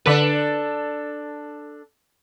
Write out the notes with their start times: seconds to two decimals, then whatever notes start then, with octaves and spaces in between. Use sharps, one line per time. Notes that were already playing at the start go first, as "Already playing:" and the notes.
0.06 D3 D4 A4 B4